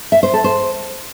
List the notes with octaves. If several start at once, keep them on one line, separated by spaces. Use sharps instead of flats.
E5
C5
A4
C5